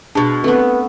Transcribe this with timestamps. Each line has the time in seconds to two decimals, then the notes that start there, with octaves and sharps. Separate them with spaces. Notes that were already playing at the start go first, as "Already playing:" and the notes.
0.15 B2 G#3 D4 A5
0.44 A3 B3 C4 B4